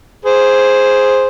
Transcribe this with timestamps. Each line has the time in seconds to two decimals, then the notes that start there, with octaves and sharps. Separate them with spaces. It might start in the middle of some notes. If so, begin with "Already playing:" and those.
0.25 G#4 C5